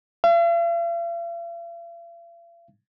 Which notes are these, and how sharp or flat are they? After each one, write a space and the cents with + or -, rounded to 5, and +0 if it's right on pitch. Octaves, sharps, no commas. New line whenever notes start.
F5 -45